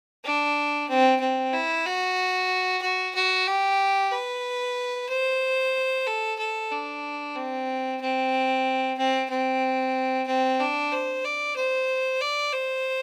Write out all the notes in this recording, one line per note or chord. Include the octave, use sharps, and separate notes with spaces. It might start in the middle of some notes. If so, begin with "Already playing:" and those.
D4
C4
C4
E4
F#4
F#4
F#4
G4
B4
C5
A4
A4
D4
C4
C4
C4
C4
C4
D4
C5
D5
C5
D5
C5